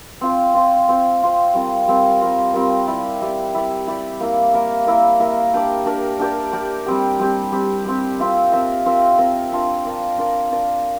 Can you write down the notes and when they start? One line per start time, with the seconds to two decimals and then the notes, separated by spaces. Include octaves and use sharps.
0.21 C4 F4 C5
0.54 C4 F4 C5
0.89 C4 F4 C5
1.22 C4 F4 C5
1.54 G3 C4 F4 A#4
1.87 G3 C4 F4 A#4
2.21 G3 C4 F4 A#4
2.54 G3 C4 F4 A#4
2.87 E4 G4 D5
3.21 E4 G4 D5
3.54 E4 G4 D5
3.87 E4 G4 D5
4.20 A#3 E4 A#4
4.54 A#3 E4 A#4
4.87 A#3 E4 A#4
5.20 A#3 E4 A#4
5.54 D4 G4 A#4 D5
5.86 D4 G4 A#4 D5
6.19 D4 G4 A#4 D5
6.53 D4 G4 A#4 D5
6.86 G3 C4 G4
7.20 G3 C4 G4
7.52 G3 C4 G4
7.85 G3 C4 G4
8.19 C4 F4 A#4 E5
8.52 C4 F4 A#4 E5
8.86 C4 F4 A#4 E5
9.18 C4 F4 A#4 E5
9.52 D4 F4 A#4 D5
9.85 D4 F4 A#4 D5
10.18 D4 F4 A#4 D5
10.51 D4 F4 A#4 D5